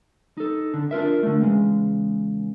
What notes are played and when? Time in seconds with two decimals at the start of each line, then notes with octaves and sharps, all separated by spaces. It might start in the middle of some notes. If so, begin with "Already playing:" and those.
0.37 D#4 A4
0.74 D3
0.91 D4 F4 A#4 E5
1.23 D3 A3
1.40 E2 C#3 G#3